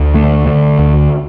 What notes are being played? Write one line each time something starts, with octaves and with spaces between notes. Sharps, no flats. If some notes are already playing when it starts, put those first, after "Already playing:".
Already playing: D2
D3 A3
D3
D2